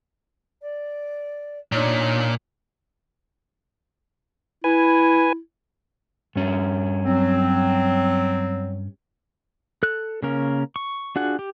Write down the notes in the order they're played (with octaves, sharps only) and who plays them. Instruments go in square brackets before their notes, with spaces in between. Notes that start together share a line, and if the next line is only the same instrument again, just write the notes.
[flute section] D5
[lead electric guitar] A#2 [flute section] D4 D#4 C#5
[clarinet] E4 [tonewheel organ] B4 G#5
[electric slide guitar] G2 C#4
[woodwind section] F#3 C4
[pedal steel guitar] A4 F#6
C#3 A#3 C#4 A#4
C#6
D4 F4 F#4 G#4 F#5
G4